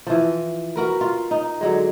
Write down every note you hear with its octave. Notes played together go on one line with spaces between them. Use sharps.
E3 F3
F#4 A#4 B4
F4
D#4
D3 F#3 G#3